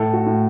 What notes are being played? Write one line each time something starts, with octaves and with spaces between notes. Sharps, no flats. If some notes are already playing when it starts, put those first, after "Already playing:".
Already playing: A2 A4
F#4
A2